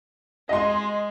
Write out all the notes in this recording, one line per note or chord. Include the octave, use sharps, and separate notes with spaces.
G#3 D#5 C6